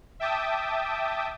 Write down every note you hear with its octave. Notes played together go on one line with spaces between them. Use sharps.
E5 G5 A5 D6 D#6